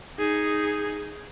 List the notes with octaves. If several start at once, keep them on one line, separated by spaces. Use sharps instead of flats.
D#4 G#4